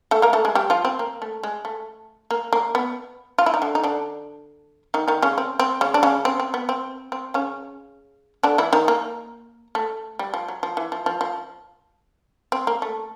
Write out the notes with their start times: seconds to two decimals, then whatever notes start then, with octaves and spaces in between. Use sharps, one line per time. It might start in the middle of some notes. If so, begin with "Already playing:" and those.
0.11 A3 A4
0.22 A#3 A#4
0.33 A3 A4
0.45 G#3 G#4
0.55 G3 G4
0.70 F3 F4
0.85 C4
0.99 A#3
1.22 A3
1.43 G#3
1.65 A3
2.31 A#3
2.53 A#3
2.75 B3
3.38 F4
3.46 E4
3.54 D#4
3.62 D3 D4
3.75 D#4
3.84 D3 D4
4.94 D#3 D#4
5.08 D#3 D#4
5.22 C#3 C#4
5.38 C4
5.59 C4
5.81 C#3 C#4
5.94 D4
6.03 C#3 C#4
6.25 C4
6.40 C4
6.54 B3
6.69 C4
7.12 C4
7.34 C#3 C#4
8.43 D3 D4
8.58 E3 E4
8.73 D#3 D#4
8.88 A#3
9.75 A3
10.19 G3
10.34 F3
10.48 F#3
10.63 F3
10.77 E3
10.92 F3
11.06 F3
11.21 F3
12.52 C4
12.67 A#3
12.82 A3